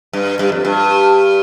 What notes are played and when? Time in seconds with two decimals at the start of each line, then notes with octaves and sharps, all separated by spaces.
0.13 G2
0.39 G2
0.52 F2
0.65 G2